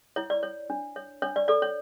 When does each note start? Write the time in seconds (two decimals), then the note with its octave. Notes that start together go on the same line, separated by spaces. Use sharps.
0.16 E4 C#5
0.30 D5
0.43 C#5
0.70 D4
0.96 C#5
1.22 D4 C#5
1.36 D5
1.48 A4 D5
1.62 C#5